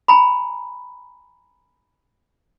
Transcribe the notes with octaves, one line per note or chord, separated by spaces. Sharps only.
G#5 A#5 B5